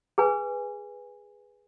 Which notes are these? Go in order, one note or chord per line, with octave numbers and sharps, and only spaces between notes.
G#4 B4 G#5